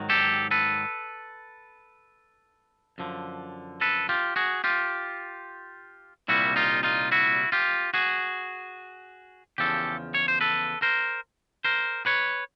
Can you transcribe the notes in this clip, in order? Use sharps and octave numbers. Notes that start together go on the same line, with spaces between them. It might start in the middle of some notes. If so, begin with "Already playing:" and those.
Already playing: G#2 D#3 F#3
G4 A4
A4 B4
F#2 D3 F3
A4 B4
F4 G4
F#4 G#4
F4 G4
C2 A#2 G3 E4 F#4
D#4 F4
D#4 F4
E4 F#4
F4 G4
F#4 G#4
E2 C#3 F3 G4 A4
C#5
C5
A4 B4
A#4 C5
A#4 C5
B4 C#5